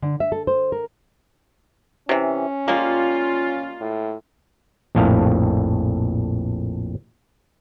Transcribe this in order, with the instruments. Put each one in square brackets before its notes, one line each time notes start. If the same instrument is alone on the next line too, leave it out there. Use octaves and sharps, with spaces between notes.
[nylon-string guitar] D3
E5
A4
C5
A#4
[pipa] C3 E3 [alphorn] C#4
[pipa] G3 G#3 A#3 [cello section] F4
[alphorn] A2
[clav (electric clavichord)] A#1 F2 A2 F5